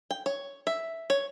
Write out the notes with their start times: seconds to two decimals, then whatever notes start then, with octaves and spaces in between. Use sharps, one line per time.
0.11 G5
0.26 C#5
0.67 E5
1.10 C#5